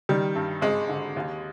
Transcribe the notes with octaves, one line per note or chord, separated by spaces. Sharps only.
D#3 G3
G2
G#1 G#3
D3
D#2